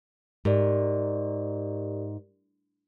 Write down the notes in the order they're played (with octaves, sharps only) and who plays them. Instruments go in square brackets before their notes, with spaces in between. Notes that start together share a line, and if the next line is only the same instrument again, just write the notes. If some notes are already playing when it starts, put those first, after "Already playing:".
[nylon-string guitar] G#2 [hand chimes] G4 A#4 D5